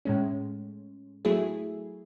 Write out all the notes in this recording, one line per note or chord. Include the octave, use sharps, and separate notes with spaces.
A2 G#3 C#4
F#3 A3 E4 G#4